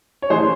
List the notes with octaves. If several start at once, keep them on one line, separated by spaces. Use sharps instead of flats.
C#5
C#3 E3 G#4 C5